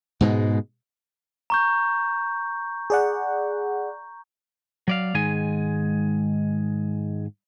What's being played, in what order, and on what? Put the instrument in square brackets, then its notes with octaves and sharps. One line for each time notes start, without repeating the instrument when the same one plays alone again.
[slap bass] G#2 B2 G#3
[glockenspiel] A#5 C#6 G6
[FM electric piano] G#4 D5 F#5
[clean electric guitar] F#3 D5 F5
G#2 D#3 G#3 G#4 G#5